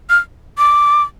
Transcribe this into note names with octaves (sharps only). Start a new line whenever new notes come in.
F6
D6